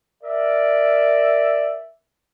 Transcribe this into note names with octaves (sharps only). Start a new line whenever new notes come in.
A#4 D5 E5